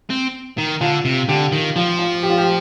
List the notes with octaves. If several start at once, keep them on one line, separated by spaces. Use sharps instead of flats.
C4
D#3
D3 F4
C3
D3 G4
D#3
F3 F4
F4
G4
F4
G4